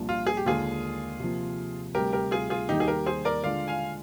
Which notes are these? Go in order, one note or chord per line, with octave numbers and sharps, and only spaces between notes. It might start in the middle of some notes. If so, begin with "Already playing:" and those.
Already playing: C2 A#2 F3 A#3 D4
F4
G#4
G4
D#2 D3 G#3 F4 G#4
C3 F3 A#3
D2 C3 G3 G4 A#4
G4 A#4
F4 G#4
F4 G#4
D#2 D#3 G3 A#3 D#4 G4
G#4
G4 A#4
G#4 C5
A#4 D5
D3 G#3 D4 F4 D5 F5
F5 G#5